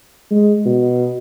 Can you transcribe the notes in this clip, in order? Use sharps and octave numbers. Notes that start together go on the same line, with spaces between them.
G#3
B2